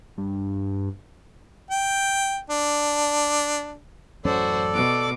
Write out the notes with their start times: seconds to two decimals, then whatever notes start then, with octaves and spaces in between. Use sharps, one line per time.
0.18 G2
1.71 G5
2.50 D4
4.25 A1 F#2 C#4 F#4 A4 C5 D5
4.74 B2 D6